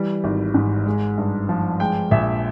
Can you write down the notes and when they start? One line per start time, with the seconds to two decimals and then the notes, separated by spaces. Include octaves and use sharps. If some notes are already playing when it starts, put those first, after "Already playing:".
Already playing: E3 G3
0.24 G#1
0.54 G#2
0.86 G#3
1.18 G2
1.49 F3
1.80 G#3 G5
2.11 A#1 E5